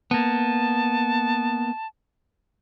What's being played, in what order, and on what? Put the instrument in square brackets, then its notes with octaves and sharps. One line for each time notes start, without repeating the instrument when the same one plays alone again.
[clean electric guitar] A#3 B3 [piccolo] A5